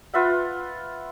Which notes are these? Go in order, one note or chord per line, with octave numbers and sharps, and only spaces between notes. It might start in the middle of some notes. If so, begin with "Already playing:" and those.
F4 B4 E5 F#5